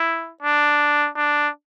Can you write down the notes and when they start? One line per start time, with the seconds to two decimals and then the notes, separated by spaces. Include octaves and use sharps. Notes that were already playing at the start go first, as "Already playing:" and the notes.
Already playing: E4
0.42 D4
1.16 D4